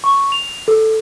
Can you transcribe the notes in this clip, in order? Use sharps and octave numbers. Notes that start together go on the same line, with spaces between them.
C#6
F7
A4